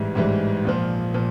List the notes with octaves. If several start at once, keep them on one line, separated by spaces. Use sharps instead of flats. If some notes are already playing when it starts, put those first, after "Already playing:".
Already playing: A1 G#2 E3 G3
A1 G#2 E3 G3
A#1 A#2 F3
A#2 F3